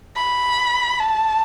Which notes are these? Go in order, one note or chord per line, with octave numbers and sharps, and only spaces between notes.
B5
A5